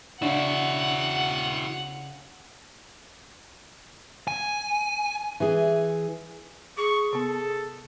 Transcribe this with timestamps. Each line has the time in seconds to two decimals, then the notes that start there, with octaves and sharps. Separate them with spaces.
0.22 C#3 C#4 D4 E4 F#4 F#5
4.28 G#5
5.40 E3 G#4
6.77 G#4 C#6 D6
7.13 C3 B3 A4